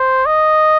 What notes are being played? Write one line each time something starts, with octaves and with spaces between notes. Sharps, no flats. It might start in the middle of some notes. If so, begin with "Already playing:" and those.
Already playing: C5
D#5